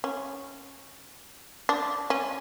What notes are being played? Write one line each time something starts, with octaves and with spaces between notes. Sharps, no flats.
C#4
D4
C#4